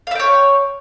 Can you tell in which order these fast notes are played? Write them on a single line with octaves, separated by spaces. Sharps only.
F5 E5 G5 C#5